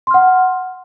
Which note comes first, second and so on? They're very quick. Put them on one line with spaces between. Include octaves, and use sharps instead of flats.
C6 F6 F#5